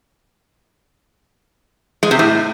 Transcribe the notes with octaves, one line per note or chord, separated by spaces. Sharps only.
G#3
C3
A2